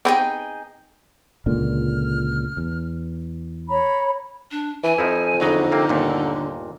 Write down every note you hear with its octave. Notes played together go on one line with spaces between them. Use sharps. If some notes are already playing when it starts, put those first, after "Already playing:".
B3 C4 D#4 G4 G#4 G5
C#2 A#2 D3 F6
E2
C#5 A#5 B5
D4
E3 G#5
F2 F3 D#4 E4
E2 D3 F#3 D#4 D#5
C3 A#3 C4
G1 D#2 A#2